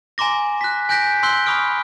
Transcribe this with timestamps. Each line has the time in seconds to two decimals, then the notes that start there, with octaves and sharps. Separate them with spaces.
0.18 G#5 A#5 C6 D6 A#6
0.61 F#6 B6
0.89 G#5 F#6 G6 A#6 B6 D7
1.23 C6 E6 F#6 G6 C7 G7
1.46 B5 C#6 D#6 F6 D7